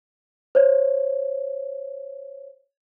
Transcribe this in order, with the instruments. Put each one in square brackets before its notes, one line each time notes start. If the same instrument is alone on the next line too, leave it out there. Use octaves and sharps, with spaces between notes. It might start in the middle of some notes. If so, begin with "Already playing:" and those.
[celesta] C5 C#5